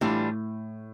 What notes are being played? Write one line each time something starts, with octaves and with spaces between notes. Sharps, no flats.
A2 E3 G3 D4 F4